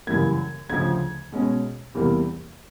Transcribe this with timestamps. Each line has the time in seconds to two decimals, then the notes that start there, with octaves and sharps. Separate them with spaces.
0.07 F#2 C#3 E3 G3 A#3 G#6
0.69 D2 C#3 F3 G#6
1.32 B2 G#3 C#4
1.94 E2 C3 E3 G3 A#3